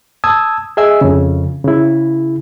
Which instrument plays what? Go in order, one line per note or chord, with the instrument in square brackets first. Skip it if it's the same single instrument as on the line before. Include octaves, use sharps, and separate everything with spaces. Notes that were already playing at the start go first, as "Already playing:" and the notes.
[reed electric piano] A5 D#6 E6 G#6
G#4 D#5 E5 G#5 E6
F2 C#3
C#3 E4